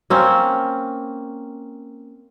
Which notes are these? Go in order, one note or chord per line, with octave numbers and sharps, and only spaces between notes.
A#3 C4 C#4